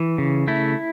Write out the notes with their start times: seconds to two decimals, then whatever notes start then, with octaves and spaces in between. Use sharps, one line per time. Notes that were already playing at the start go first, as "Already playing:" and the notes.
Already playing: E3
0.18 C#3
0.48 A3 E4